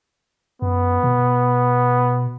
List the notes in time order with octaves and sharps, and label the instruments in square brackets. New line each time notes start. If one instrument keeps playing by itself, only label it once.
[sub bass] F#2 [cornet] B3
[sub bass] B2